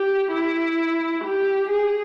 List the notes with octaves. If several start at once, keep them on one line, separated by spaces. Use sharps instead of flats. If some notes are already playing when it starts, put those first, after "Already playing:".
Already playing: G4
E4
G4
G#4